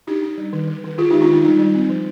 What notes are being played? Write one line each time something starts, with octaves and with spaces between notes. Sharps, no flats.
D4 D#4 G4
D4
G3
D#3
D#3
D#3
D#3 F4 G#4
D#4 G4
G#3
D4 F4
D#3 D#4
G3 D#4
G3
C4
F3